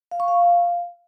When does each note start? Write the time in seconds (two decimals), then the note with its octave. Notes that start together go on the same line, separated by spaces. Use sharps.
0.11 F5
0.20 C#6
0.28 F5